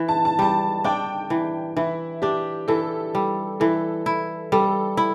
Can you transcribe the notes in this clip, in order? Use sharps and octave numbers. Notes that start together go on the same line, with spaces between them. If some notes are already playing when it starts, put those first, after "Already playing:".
Already playing: E3
A5
A5
G3 A5
D4 G5
E3
E3 E4
D4 G4
E3 A4
G3
E3 A4
E4
G3 A4
E4